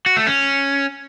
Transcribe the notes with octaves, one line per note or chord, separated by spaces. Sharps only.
F#4
A3
C#4